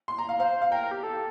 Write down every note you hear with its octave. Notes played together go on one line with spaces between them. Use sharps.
C6
A#5
F5
C5 F5
F5
A#4 G5
G4
A4